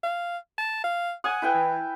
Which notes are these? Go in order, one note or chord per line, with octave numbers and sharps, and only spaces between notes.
F5
A5
F5
F#5 G#5 D#6
E4 B4 G5
E3